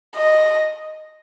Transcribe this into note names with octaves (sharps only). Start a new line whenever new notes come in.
D#5